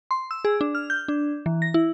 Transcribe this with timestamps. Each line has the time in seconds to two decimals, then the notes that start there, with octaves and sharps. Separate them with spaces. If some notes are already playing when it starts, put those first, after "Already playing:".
0.11 C6
0.31 E6
0.45 G#4
0.61 D4
0.75 F6
0.90 G6
1.08 D4
1.46 E3
1.62 A#6
1.74 E4